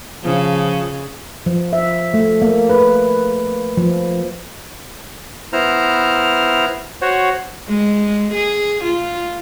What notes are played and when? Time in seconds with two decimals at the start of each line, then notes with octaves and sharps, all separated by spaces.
0.24 C#3 F3
1.46 F3
1.73 E5
2.14 A3
2.42 A#3
2.69 B4
3.77 F3
5.53 B3 E4 C5 A#5 F6
7.02 F#4 C5 C#5 F#5
7.69 G#3
8.34 G#4
8.85 F4